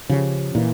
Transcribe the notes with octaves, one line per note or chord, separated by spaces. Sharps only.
C#3 F3 C#4 G4
A#2 E3